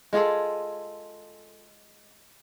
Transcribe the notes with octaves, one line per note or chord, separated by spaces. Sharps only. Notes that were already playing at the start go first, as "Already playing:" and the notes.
G#3 F4 G#4 A4